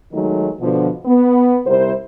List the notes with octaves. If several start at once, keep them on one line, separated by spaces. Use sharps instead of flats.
D#3 F#3 G#3 A3 D#4
B2 D3 F3
B3
C3 G3 E4 A#4 C5